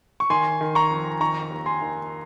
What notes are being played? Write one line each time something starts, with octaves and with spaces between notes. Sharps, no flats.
C#6
D#3 G#5 C6
D#3
A#5 C#6
F2
D#3 A#5 C#6
D#2
G#5 C6
D#3